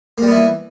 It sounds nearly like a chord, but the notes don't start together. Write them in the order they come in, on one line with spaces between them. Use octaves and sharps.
A#3 G3 B3 E4 E3